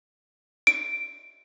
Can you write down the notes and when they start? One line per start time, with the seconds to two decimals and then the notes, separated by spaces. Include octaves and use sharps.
0.67 D7